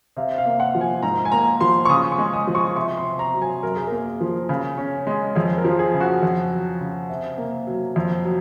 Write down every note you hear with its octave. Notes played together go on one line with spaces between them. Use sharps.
C3 F5
F5
A#3
F#5
F3
G#5
G#2 A#5
G#5
A#3 A#5
F3 C6
C#6
C#3 D#6
C#6
G#3
D#6
F3
C#6
C3 C#6
C6
C4
A#5
F#3
G#5
F#2 A#4
G#4
A#3 A#4
F3
C#3
C#4
G#3
F2 G#4
A#4
F3
G#4
C#3
F#4
F2
F#3
C#3
C3
A#3
F#3
F2
F#3